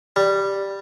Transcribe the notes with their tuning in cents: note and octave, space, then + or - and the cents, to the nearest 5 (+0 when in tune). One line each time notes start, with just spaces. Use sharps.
G3 +0